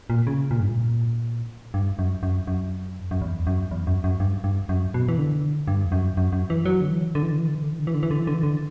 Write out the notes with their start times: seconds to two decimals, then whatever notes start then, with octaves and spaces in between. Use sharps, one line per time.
0.10 A#2
0.27 C#3
0.51 A#2
0.60 G2
0.69 A#2
1.74 G2
1.99 F#2
2.23 F#2
2.47 F#2
3.11 F#2
3.22 E2
3.47 F#2
3.71 E2
3.87 F#2
4.04 F#2
4.20 G2
4.44 G2
4.69 F#2
4.94 B2
5.08 E3
5.18 D3
5.68 G2
5.86 E2
5.92 F#2
6.17 F#2
6.32 F#2
6.50 E3
6.65 F#3
6.81 D3
6.90 E3
7.15 D3
7.23 E3
7.32 D3
7.38 E3
7.47 D3
7.55 E3
7.62 D3
7.71 E3
7.79 D3
7.87 E3
7.94 D3
8.03 E3
8.11 D3
8.19 E3
8.27 D3
8.34 E3
8.43 D3